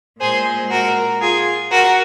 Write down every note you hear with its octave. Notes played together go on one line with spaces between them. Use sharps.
A#2 G#3 G#4 C5
F#4 A#4
F4 G#4
F#4 A#4